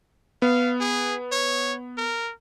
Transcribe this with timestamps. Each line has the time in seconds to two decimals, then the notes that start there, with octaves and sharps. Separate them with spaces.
0.42 B3 F5
0.80 G#4
1.32 C#5
1.97 A#4